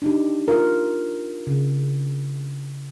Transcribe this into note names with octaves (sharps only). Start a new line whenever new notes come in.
D4 D#4 G4
F4 A#4
C#3